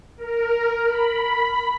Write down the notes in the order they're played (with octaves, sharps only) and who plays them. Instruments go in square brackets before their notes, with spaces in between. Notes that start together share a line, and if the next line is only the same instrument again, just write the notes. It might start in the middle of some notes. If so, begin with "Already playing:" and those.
[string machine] A#4
B5